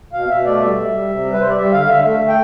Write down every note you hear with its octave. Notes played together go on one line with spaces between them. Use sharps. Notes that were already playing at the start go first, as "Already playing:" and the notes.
B2 F5
B2 E5
A3 D5
G3 E5
G3
G3
C3
G3
B4
G3 C5
D5
G3 E5
D3 F5
D3 E5
A3 E5
A3
G5